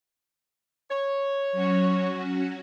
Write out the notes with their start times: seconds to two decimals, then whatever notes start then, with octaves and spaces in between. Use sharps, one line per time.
0.91 C#5
1.52 F#3 C#4 F#4